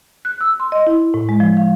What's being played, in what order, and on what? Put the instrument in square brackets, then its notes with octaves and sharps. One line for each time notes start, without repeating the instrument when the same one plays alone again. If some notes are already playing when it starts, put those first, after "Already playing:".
[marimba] F#6
E6
C6
D#5
E4
A2
G#3
F3
F5